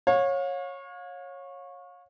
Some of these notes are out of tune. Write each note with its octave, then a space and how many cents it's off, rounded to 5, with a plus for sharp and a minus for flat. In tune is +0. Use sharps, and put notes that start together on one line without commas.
C#5 -15 F5 +35